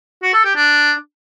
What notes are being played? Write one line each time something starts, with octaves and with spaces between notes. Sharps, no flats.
F#4
A4
G4
D4